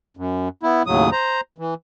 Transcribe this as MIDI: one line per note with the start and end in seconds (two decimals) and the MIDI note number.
0.17 0.48 42
0.63 0.83 59
0.63 0.83 64
0.87 1.10 39
0.87 1.10 45
0.87 1.10 49
0.87 1.10 54
0.87 1.10 87
1.12 1.41 72
1.12 1.41 82
1.58 1.74 52